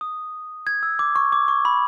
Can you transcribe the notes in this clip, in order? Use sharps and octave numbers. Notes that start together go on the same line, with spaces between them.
D#6
G#6
E6
D6
C#6
D6
C#6
B5